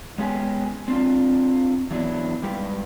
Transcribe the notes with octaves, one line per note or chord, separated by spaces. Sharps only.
G#3 B3 C#4 G4 G5 G#5
C4 D4 F4
E3 F#3 B3 D4 E4
G#2 G3 G4 B4